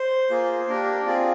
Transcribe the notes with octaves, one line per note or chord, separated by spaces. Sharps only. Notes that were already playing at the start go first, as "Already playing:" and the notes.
Already playing: C5
A#3 F4 G#4
A#3 D4 G4 A#4
C4 F4 G#4 D5